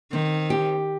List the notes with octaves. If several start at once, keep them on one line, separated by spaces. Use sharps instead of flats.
D#3 C4
G4